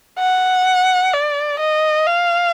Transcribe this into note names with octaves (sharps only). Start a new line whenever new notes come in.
F#5
D5
D#5
F5